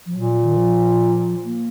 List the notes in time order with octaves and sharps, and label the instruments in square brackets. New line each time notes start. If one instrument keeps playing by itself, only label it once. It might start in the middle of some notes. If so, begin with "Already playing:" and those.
[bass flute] F3
[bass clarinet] A#2 [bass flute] F#3
[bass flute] D#3
F3
A#3